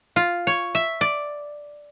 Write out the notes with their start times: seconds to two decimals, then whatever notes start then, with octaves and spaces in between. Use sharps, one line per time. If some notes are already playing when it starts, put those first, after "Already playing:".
0.16 F4
0.47 C#5
0.75 E5
1.01 D5